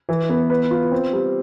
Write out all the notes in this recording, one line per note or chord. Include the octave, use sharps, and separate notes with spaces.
E3
B3
B4
F4
C4
G3